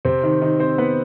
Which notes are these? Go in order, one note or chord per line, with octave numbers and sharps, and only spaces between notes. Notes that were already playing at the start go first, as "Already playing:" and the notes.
C3 C4
D#3 D#4
D#3 D#4
C4 C5
B3 B4